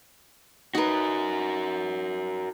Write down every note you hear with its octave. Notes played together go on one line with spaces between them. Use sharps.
D#4 F#4 A#4 B4